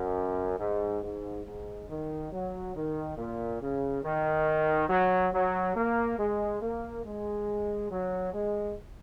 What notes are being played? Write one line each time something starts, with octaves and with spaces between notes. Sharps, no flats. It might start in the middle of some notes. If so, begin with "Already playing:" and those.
Already playing: F#2
G#2
G#2
G#2
D#3
F#3
D#3
A#2
C#3
D#3
F#3
F#3
A#3
G#3
A#3
G#3
F#3
G#3